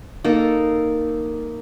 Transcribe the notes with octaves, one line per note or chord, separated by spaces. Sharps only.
A#3 D#4 A4